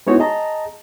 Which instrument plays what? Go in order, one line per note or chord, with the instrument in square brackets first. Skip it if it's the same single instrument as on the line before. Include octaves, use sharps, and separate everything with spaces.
[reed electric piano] G#3 B3 D#4 E4 F#4 C#5
G#4 D#5 A5 A#5